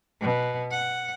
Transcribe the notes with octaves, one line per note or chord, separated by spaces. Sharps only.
B2
F#5